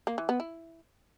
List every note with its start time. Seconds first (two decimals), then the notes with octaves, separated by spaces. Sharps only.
0.07 A#3
0.18 E3
0.29 B3
0.40 E4